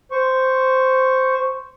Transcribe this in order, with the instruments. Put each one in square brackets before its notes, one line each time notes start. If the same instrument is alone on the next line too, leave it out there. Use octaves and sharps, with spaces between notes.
[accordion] C5 C#6